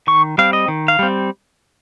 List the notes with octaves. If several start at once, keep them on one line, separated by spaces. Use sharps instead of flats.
D#3 C#6
G3 C4 F5
D#5
D#3
F5
G3 C4